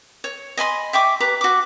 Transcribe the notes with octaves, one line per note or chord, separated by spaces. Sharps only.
C#5
D#5 G#5 B5 C6
E5 G5 C#6 D6
G4 B4 A#5 D6
F#4 D6